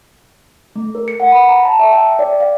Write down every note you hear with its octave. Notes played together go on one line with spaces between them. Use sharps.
A3
A#4
C#7
F#5
B5
A#5
A5
E5
G5
G5
D5
F5